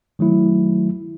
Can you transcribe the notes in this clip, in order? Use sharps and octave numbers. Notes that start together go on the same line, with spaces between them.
D#3 F#3 A3 E4